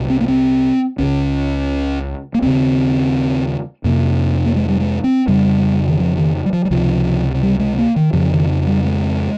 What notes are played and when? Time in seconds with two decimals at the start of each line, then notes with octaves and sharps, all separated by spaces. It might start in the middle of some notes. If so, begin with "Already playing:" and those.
Already playing: C2 A#2
0.10 C4
0.21 A#3
0.28 C4
0.98 C#2 C#3 C#4
2.34 A#3
2.42 D#2 C#3 C4
3.84 F2 C3 A#3
4.46 A#3
4.56 G#3
4.69 G3
4.81 G#3
5.04 C4
5.27 F2 C#3 G3
5.88 D#3
6.00 F3
6.18 D#3
6.46 G3
6.53 F3
6.65 G3
6.71 C#2 C3 F3
7.43 G3
7.59 G#3
7.78 A#3
7.96 D#3
8.13 F2 C#3 F3
8.31 D#3
8.67 G3
8.85 G#3